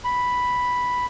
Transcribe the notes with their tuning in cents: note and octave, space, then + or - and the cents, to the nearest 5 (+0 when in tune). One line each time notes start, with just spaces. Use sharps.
B5 +0